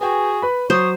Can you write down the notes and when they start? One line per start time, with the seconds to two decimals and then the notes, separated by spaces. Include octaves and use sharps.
0.01 F#4 G#4 B4 G5 G#5
0.42 B4 B5
0.70 F#3 C5 C#5 D#6